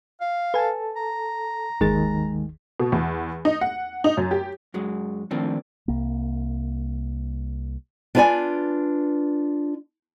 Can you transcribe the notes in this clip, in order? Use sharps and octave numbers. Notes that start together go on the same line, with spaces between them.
F5
A4 B4 G#5 A5
A#5
G1 D#2 D#3 G#3 G#4 A6
B2
E2
D#4
F#5
D#4
F#2
G4
F#2 F#3 G#3
D#3 F3 A3 A#3 C4 D4
C2 A#3
D4 F4 B4 C#5 D5 G#5